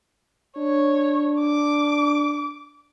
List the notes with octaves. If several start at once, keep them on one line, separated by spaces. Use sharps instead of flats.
D4 C#5
D6